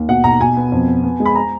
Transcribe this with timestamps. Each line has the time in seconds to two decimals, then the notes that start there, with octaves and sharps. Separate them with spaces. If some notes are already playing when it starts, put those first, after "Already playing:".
Already playing: D#2
0.08 B2 F#5
0.24 B1 A#5
0.41 B1 G#5
0.57 B3
0.72 F2
0.87 B3
1.04 B3
1.20 G#3
1.25 B5
1.35 A#5